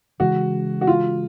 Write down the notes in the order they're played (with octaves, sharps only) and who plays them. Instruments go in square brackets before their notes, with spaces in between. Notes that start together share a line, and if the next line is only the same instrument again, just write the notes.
[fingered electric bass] C#3 E3 G#3 [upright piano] F#4
[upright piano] F#4
F4